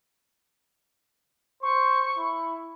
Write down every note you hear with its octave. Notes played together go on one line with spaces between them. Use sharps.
C5 C#6
E4